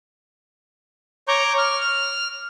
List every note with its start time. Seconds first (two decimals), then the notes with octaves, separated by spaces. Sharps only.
1.28 C#5 A#5 C#6 D6 G6
1.58 F6